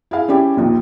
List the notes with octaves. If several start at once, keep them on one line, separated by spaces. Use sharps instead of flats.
E4 G#4 F5
C#4 D4 E4 G4
A#1 D#2